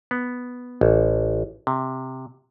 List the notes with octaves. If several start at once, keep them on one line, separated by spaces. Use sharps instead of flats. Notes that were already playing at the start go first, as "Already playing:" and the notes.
B3
A1
C3